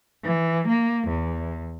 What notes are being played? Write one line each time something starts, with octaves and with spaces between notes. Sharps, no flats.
E3
A#3
E2